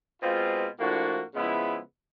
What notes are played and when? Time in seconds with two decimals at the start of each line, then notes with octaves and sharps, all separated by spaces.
0.22 B2 G#3 C4 F4
0.78 A2 F3 A#3 D4 F#4
1.34 C#3 F3 G#3 B3 E4